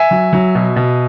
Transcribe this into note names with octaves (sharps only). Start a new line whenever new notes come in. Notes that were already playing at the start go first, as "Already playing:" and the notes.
Already playing: E5 G#5
F#3
F#3
B2
B2